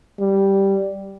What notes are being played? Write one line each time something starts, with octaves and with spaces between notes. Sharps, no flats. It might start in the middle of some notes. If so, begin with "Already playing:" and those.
G3